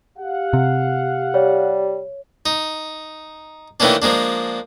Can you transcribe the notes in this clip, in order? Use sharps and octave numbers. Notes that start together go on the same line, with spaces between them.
G4 F5 F#5
C3
G3 C#5
D#4
D#3 E3 A3 A#3 C#4 D4
F3 G#3 A#3 D4